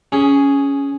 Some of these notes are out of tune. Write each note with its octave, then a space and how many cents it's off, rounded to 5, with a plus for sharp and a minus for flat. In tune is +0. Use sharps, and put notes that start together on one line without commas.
C#4 +10 G#4 +0